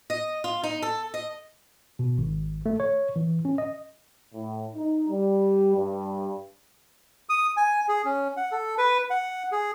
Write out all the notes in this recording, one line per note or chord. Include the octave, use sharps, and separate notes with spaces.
D#5
F4
D#4
A4
D#5
B2
G#1
A3
C#5
E3
C#4
D#5
A2
D#4
G3
G2
D#6
G#5
G#4
C#4
F#5
A4
B4
F#5
G#4